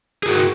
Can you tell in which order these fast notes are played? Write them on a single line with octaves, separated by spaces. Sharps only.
G#4 A#4 F#4